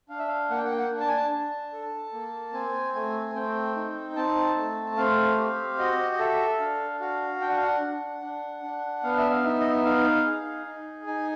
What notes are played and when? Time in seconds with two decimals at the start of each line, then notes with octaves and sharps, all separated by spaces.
0.09 D4 F5
0.19 E5
0.28 F5
0.50 A#3 F#5
0.57 G5
0.65 F#5
0.71 G5
0.79 F#5
0.91 D4
1.00 A5
1.08 G#5
1.17 A5
1.32 D4
1.73 A4
2.13 A#3
2.53 C4 G#5
2.94 A3 G#5
3.35 C4 G5
3.76 D#4
4.16 C4 A5
4.57 A3
4.97 C4 F5
5.38 G4
5.78 F#4 D#5
6.12 D#5
6.19 A4 E5
6.60 D4 F5
7.00 F#4 F5
7.41 D4 G5
7.49 F#5
7.57 F5
7.64 F#5
7.82 D4
8.22 D4
8.63 D4
9.04 B3 F5
9.18 E5
9.30 F5
9.44 D#4 E5
9.60 D#5
9.73 E5
9.85 D#4 F5
10.26 G#4
10.66 D#4
11.07 D#4 G#5